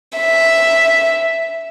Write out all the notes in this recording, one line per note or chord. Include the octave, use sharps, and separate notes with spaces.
E5